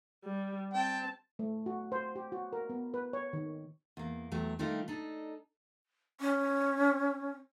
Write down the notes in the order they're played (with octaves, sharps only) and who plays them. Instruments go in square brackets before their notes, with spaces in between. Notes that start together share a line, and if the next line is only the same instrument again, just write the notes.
[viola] G3
[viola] C4 A5 [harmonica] G5
[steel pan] A3
F#4
C5
G4
F#4
A#4
B3
B4
C#5
D#3
[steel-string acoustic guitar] E2 A#3
E2 F#3 A3 G4
D#3 G3 A3 D4 D#4 F4
D4 D#4 A4
[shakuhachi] C#4